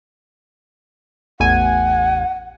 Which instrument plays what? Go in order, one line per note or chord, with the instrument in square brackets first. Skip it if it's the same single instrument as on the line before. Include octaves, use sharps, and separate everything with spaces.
[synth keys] A1 E2 G#5 [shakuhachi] F#5